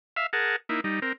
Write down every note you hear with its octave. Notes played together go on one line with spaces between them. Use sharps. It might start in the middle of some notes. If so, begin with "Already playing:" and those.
E5 F5
G#4 A#4 F#5 A5
A#3 D#4 E4
G3 D#4
C4 A#4